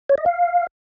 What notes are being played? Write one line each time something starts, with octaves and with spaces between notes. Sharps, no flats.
C#5
D#5
F5